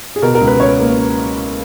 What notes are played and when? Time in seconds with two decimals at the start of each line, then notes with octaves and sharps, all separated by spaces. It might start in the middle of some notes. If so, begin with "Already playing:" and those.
0.16 G#4
0.22 B2 A#4
0.35 A#4
0.41 C#2
0.47 B4
0.60 C#2 C#5
0.79 A#3